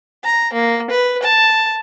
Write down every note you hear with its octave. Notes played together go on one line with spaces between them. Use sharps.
A#5
A#3
B4
A5